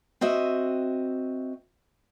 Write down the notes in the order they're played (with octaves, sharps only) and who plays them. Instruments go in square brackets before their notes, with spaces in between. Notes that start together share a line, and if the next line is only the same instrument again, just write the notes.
[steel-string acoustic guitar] C4 F#4 D#5 E5